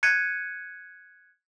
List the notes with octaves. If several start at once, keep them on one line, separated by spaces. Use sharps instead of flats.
F#6 G#6 C#7 D#7